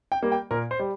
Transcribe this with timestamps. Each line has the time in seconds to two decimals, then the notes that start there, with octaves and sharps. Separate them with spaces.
0.12 G5
0.22 G3 A#3
0.32 G5
0.51 A#2 A#4
0.71 C5
0.79 G3